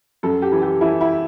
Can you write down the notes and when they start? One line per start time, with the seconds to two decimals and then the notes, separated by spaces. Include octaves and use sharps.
0.23 F#2 A4
0.42 G4
0.52 E3
0.62 G4
0.81 E3 E4
1.01 E4